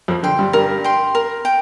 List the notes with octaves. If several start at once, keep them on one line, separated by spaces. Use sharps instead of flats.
F2 F3
D3 G5 C6
G2 G3
G2 G3 A#4
G5 C6
A#4
G5